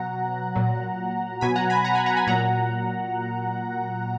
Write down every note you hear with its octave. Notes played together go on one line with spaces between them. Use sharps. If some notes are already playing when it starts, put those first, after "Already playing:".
Already playing: B2 F#3 F#5 A#5
A#2 F#3
B2 F#3 G#5 B5
F#5 A#5
G#5 B5
F#5 A#5
G#5 B5
F#5 A#5
G#5 B5
A#2 F#3 F#5 A#5